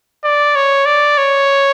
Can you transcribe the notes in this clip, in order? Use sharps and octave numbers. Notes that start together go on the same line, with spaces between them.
D5
C#5
D5
C#5